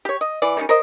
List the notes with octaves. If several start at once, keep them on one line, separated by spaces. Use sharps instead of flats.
G4 C#5
D#5
E3 D5
D#3 G3 A#3 C#4
A#4 C5 D#5